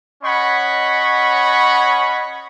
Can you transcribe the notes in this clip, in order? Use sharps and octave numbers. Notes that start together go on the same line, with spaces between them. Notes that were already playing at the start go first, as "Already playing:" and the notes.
C#4 C#5 D#5 F#5 B5 C#6